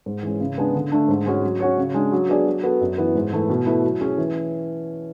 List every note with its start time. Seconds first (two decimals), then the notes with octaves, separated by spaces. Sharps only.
0.06 G#2
0.23 E3 G#3 C#4
0.40 C#3
0.57 G#3 B3 D4 G#4
0.75 D3
0.92 A3 D4
1.08 G#2
1.26 G#3 C#4 F#4 C#5
1.43 F#3
1.60 C#4 F#4 C#5
1.78 C#3
1.94 G#3 D4
2.12 F#3
2.29 B3 D4 G#4 D5
2.46 F#3
2.63 B3 F#4 A4
2.81 F#2
2.98 E3 B3 E4
3.15 G#2
3.32 E3 A3 E4 G#4
3.49 B2
3.66 A3 E4 B4
3.84 F#3
4.01 C#4 G#4 C#5
4.18 E3